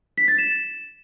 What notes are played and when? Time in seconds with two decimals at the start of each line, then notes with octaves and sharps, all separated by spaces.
0.18 B6
0.28 A6
0.38 E7